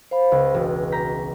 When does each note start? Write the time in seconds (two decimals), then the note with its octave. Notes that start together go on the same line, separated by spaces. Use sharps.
0.11 C5 F5 B5
0.32 C#2
0.54 E1 F#4
0.92 A#5 G6 B6